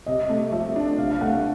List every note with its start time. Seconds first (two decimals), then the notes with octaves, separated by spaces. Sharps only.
0.06 C3 D#5
0.29 A3
0.52 F3 E5
0.76 D4
0.98 C3 F5
1.11 F5
1.21 A3 F#5